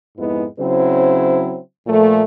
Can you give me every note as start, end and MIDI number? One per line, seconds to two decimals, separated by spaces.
0.18 0.45 41
0.18 0.45 44
0.18 0.45 56
0.18 0.45 59
0.18 0.45 64
0.59 1.59 49
0.59 1.59 54
0.59 1.59 60
0.59 1.59 64
0.59 1.59 72
1.87 2.22 46
1.87 2.22 53
1.87 2.22 57